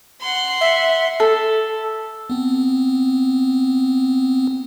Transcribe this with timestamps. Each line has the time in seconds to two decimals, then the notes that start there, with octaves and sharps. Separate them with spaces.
0.21 F#5 C6
0.61 E5
1.20 A4
2.30 B3 C4